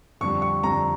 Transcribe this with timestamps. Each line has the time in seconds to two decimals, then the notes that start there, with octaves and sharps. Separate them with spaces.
0.21 F2 D3 G3 C#6
0.42 C#6
0.63 F2 D3 G3 A#5